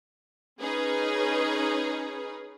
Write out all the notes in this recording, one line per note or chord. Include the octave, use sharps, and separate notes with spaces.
C#4 D#4 G#4 B4